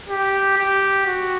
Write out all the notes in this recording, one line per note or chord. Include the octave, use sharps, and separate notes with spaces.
G4
G4
F#4